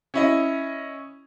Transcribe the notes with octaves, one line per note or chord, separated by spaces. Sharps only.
C#4 E4 D#5